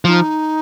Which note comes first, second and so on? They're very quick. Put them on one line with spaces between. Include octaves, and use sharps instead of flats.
F3 F4 D#4